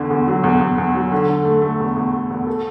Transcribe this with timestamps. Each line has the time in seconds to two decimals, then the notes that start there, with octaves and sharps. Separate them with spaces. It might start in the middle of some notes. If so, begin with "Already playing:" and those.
Already playing: E2 D3
0.10 E2
0.28 F#3
0.44 E2
0.61 E2
0.78 E2
0.95 F#3
1.12 D3
1.29 D3
1.45 A3
1.62 A3
1.80 E2
1.97 E2
2.13 E2
2.31 E2
2.47 A4